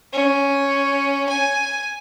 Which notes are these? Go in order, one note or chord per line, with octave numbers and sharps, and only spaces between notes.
C#4
G#5